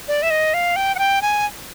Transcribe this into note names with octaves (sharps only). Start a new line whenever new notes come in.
D5
E5
D#5
F5
G5
F#5
G5
G#5